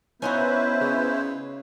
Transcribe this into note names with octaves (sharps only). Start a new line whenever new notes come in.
B3 C#4 D#4 E4 F#4 B4 C5
C#3